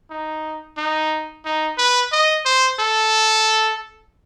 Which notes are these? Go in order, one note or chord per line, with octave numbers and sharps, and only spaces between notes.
D#4
D#4
D#4
B4
D#5
C5
A4